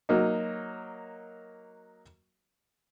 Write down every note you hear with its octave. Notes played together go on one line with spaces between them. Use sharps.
F#3 A#3 D#4